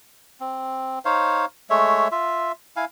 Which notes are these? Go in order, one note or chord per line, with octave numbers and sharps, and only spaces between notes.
C4
D#4 C5 C#5 F5
G#3 A3 C#5 E5
F4 E5
E4 F5 G#5